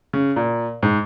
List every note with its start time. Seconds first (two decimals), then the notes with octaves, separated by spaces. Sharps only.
0.13 C#3
0.36 A#2
0.83 G#2